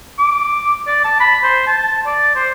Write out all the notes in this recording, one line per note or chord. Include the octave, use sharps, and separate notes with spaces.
D6
D5
A5
B5
C5
A5
D5
C5